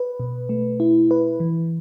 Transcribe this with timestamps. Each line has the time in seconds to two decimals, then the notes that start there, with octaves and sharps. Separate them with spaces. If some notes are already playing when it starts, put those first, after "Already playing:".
Already playing: B4
0.20 B2
0.49 A3
0.80 E4
1.11 B4
1.40 E3